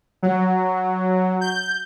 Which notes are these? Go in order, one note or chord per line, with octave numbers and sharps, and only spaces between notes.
F#3
G6